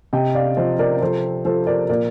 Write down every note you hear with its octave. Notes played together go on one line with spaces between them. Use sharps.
C3 D#5 G5
D5 F5
F3 C5 D#5
A#4 D5
F3 A4 C5
F3 A4 C5
A#4 D5
A#2 A#4 D5